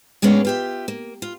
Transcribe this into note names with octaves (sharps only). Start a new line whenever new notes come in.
A2 G#3 A3 B3 C#4 D4
F4 G4 E5
A#3
F4